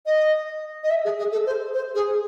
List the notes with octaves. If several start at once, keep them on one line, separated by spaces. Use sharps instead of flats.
D#5
D#5
E5
G#4
G#4
A4
C5
C5
G#4